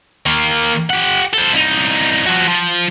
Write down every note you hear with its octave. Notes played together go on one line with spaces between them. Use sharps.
D#3 A#3
G4 F#5
A4 C5
C2 D#4
F3 F#4
F3